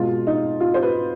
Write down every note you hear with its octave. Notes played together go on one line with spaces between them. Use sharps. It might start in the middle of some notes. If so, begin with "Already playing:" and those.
Already playing: B2 G#3 F4
D#4
F4
C5
B4